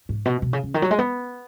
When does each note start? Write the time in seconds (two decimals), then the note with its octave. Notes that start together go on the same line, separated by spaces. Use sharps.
0.09 G#2
0.25 B2
0.42 B2
0.53 C#3
0.63 C#3
0.74 D#3
0.82 F#3
0.91 G#3
0.99 B3